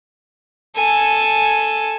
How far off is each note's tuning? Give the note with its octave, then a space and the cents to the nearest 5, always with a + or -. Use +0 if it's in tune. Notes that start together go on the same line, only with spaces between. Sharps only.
A4 +0 G#5 +0